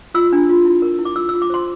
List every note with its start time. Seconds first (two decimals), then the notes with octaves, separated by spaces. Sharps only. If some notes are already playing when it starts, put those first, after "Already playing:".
0.14 F4 E6
0.33 D4
0.49 F4
0.65 E4
0.82 A#4
0.99 E4
1.05 D6
1.16 F4 E6
1.29 E6
1.33 F4
1.42 D6
1.50 C5 C6